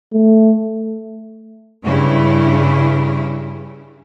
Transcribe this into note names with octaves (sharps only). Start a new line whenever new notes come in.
A3
G2 C#3 E4